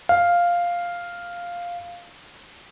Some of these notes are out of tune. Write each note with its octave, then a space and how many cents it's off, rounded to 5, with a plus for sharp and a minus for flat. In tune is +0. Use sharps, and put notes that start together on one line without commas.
F5 +0